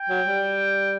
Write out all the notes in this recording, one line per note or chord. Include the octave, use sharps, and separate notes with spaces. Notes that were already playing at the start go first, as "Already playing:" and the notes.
Already playing: G5
F#3
G3